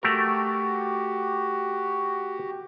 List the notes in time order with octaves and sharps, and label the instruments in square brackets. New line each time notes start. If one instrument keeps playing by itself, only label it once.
[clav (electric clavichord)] A3 A#4 [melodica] F#4 G4